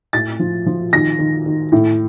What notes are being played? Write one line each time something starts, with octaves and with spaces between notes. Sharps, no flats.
A2 A6
F3
F3
D#3 A#6
D#3
D#3
A2